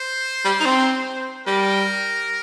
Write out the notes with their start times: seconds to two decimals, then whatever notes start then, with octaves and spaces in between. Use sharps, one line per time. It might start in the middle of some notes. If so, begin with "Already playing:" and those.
Already playing: C5
0.45 G3
0.60 D#4
0.65 C4
1.46 G3 A#4